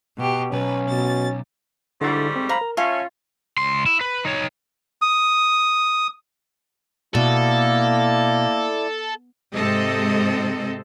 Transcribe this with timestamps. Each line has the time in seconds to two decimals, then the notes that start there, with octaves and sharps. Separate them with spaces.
0.18 B2 G4
0.53 B1 C#4 B4
0.89 B2 A6
2.01 G#2 D3 G3 A3 E4 A6
2.36 C4
2.49 C5 F5 A#5 B5
2.61 A#4
2.77 C#4 F4 E5 F5 A5
3.58 C#2 C6
3.86 E4
4.01 B4
4.25 D#4 C#5
5.02 D#6
7.15 B2 A#3 E4 A4 D5
9.53 G#2 C3 G#3 C4 A4 D#5